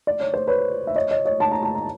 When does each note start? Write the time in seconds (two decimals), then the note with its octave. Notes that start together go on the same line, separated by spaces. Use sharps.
0.07 D5
0.20 C#5
0.34 C5
0.47 B4 C#5
0.87 E5
0.96 C#5 D#5
1.11 C#5 D#5
1.25 C#5 D#5
1.40 A5
1.52 A#5
1.63 A5
1.75 A#5